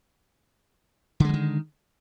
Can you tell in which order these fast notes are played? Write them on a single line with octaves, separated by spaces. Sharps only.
D3 G#3 F3 D#3